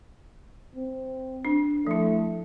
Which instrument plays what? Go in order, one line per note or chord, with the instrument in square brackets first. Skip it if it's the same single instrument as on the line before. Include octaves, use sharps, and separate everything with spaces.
[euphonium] C4
[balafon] D4
[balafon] F3 E4 [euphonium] A3